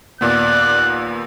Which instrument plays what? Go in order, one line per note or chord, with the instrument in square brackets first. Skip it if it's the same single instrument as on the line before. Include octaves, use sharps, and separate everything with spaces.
[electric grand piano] D#2 A#2 B3 [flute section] D5 D6 [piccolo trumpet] F#6